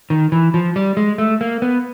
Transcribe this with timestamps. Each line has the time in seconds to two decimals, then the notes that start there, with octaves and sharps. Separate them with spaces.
0.10 D#3
0.32 E3
0.54 F3
0.76 G3
0.97 G#3
1.18 A3
1.41 A#3
1.62 B3